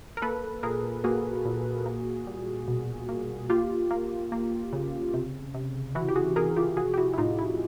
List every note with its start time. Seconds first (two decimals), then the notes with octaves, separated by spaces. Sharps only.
0.17 A#4
0.22 A#3 A4 B4
0.63 A#2 G#4 A#4
1.04 A#3 F#4 G#4
1.45 A#2
1.86 A#3
2.27 G3
2.68 B2
3.09 A#3
3.50 A#3 F4 G4
3.91 A#3
4.32 A#3
4.73 C#3
5.14 C3
5.54 C3
5.95 E3 E4 F#4
6.08 G4
6.15 F#4 G#4
6.36 C3 G#4 A#4
6.57 F4 G4
6.77 F3 F#4 G#4
6.94 G4
6.98 E4 F#4
7.14 E4
7.18 A2 D#4 F4
7.39 E4